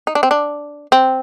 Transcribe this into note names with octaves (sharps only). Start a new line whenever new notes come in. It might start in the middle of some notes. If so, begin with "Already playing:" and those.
D#4
D4
C4
D4
C4